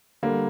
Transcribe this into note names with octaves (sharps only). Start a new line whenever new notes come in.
D3 G3 A#3